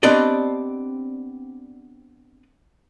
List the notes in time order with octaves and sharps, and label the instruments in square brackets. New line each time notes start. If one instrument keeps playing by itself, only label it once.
[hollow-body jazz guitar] B3 C4 D4 G4 D5 D#5